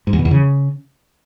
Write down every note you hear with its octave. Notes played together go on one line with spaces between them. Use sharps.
G#2
E2
B2
E2
C#3